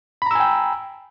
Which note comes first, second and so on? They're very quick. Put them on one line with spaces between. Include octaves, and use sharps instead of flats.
B5 A#5 E6 G#5 G5